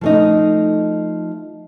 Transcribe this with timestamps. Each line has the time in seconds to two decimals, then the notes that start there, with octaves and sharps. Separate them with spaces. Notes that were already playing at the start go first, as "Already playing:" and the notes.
0.01 F3 A3 D#4